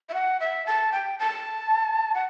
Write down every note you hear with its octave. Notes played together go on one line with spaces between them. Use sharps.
E5
F#5
E5
A5
G5
A5
F#5